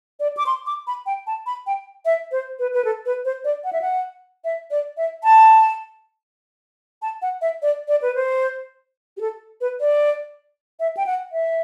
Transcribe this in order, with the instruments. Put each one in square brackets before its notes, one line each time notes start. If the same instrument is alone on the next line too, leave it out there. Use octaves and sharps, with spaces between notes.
[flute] D5
D6
C6
D6
B5
G5
A5
B5
G5
E5
C5
B4
B4
A4
B4
C5
D5
F#5
E5
F#5
E5
D5
E5
A5
A5
F#5
E5
D5
D5
B4
C5
G4
A4
B4
D5
E5
G5
F#5
E5